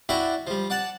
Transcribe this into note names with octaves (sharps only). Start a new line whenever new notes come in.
D4 E4 F#4 D5 E5 G5
F3 G3
D5 F#5 A5